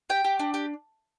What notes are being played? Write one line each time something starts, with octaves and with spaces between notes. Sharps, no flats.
G4 G5
G4
D4
G4